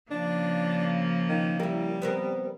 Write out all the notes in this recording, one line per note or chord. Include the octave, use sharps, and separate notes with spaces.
C#3 F3 A#3 D4
D#3
G3 E4 A#4
B3 C4 A#4